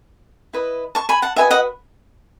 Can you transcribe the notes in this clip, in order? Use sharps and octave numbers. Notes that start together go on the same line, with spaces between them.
E4 B4 D#5
A5 C#6
G#5 B5
F#5 A5
F#4 B4 D#5 E5 G#5
D#5 F#5